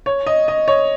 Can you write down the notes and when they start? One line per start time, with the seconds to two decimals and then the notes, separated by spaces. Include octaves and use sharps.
0.06 C#5
0.26 D#5
0.48 D#5
0.68 C#5